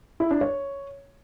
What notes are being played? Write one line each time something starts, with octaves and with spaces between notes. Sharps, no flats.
E4
D4
C#5